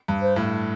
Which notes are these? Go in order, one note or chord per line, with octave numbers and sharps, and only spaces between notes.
G2
C5
A2